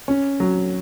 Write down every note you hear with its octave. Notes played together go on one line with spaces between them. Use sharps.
C#4
F#3